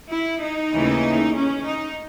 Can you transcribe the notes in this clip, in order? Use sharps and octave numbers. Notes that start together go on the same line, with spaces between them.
E4
D#4
D#2 C#3 E3 A3
C#4
D#4